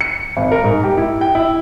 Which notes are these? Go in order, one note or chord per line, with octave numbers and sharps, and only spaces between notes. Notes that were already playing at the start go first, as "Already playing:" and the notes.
C#7
G#1
A#4
G#2
G4
E4
G5
E4